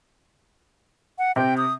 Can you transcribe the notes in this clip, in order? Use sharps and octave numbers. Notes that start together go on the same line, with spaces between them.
F#5
C3 C4 G5
D#6